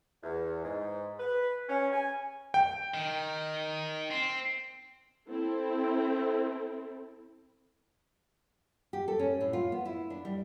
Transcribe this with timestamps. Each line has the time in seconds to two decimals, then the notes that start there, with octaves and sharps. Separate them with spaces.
0.23 E2
0.63 G#2
1.19 B4
1.68 C#4
1.91 G#5
2.54 G5
2.94 D#3
4.11 C4
5.28 C4 E4 A4
8.93 G4
9.08 A4
9.19 C#4
9.41 A2
9.53 F4
9.72 B3
9.85 E4
10.10 D4
10.25 G3